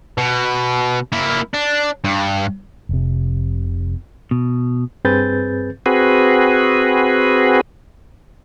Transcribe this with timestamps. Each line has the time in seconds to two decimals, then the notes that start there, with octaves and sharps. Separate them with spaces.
0.18 B2
1.12 A#3 E4
1.54 D4
2.04 G2
2.89 F1 C3
4.31 B2
5.05 G2 C4 G#4 B4 G6 A6
5.86 C4 F#4 G#4 B4